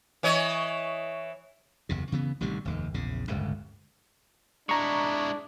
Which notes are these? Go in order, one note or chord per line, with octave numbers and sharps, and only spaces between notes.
E3 C#5 D#5
F#1 E2 C3
C#3 E3 B3
A1 C3 D#3 G3
F1 D#2 G#2
A#1 E2 C#3
D1 G1 C#2 G2
G#3 D4 E4 A#5 C#6